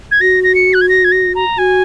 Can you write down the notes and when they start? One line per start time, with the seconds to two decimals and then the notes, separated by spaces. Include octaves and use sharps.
0.11 G#6
0.21 F#4 A#6
0.44 A#6
0.55 C#7
0.74 F#6
0.81 G#6
0.89 A#6
1.04 G#6
1.12 A#6
1.35 A#5
1.58 F#4 G#5